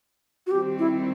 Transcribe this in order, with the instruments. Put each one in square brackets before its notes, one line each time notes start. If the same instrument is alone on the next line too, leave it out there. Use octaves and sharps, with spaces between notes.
[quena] F#4
[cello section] D#3 G3 C4 [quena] G4
[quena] E4